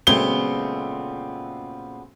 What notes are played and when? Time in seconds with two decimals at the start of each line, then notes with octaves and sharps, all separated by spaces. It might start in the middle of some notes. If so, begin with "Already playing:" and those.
0.07 A#2 C#3 F#3 G#3 A3 B3 C4 G7